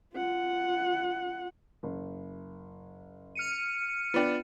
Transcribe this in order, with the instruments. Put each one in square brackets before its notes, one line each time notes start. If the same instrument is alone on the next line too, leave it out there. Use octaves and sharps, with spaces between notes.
[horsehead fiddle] F4 F#5
[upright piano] F#1
[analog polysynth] F6 C#7 D#7
[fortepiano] B3 D4 [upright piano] F4 G5